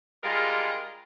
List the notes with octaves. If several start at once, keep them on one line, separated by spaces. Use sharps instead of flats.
G3 G#3 D4 F4 A#4 D#5